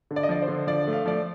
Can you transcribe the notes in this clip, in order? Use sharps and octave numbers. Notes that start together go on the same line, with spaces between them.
D3
D5
D#5
F3 D5
C5
D3
F3 D5
A3
F5
F3 D5